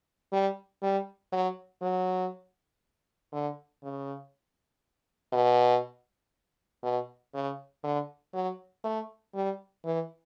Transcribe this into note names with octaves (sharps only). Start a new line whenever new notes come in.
G3
G3
F#3
F#3
D3
C#3
B2
B2
C#3
D3
F#3
A3
G3
E3